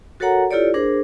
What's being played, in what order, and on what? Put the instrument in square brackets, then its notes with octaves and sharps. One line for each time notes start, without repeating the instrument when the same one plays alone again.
[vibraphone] F#4 A4 A#4 C#5 F#5 A#5
E4 F4 G4 A4 C#5 D5
D4 G#4 A#4 C5